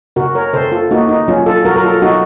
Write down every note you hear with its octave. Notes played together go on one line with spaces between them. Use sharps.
C#3 F#4 A#4
A#4 C#5
C#3 A4 C5
F4 A4
A#3 D#4 F#4
D#4
F#3 C#4 F4
F4 A4
F#3 F#4 A#4
A#4
F4 A4
F#3 D#4 F#4